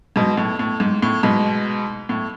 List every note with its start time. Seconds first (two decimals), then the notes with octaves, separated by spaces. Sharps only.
0.16 G#2 B2
0.37 A2
0.59 A2
0.80 G#2
1.02 A2
1.23 G#2 B2
2.09 A2